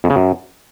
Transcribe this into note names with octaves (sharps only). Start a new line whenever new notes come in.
F2
C#3
F#2